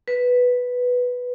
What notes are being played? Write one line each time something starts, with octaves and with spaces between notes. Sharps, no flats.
B4